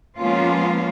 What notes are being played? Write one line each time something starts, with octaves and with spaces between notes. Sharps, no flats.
F3 G#3 A#3 B3 C#4 F4